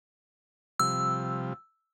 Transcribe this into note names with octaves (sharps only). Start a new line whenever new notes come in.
C3 F3 G3 E6